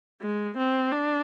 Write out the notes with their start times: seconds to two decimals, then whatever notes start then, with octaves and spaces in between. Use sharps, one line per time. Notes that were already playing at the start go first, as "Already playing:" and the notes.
0.22 G#3
0.57 C4
0.92 D4